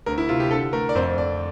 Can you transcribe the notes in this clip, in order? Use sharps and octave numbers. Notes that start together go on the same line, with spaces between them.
D2 A#4
E4
C3 F4
G4
D3 A4
A3 A#4
D5
F2 C5
F2 D5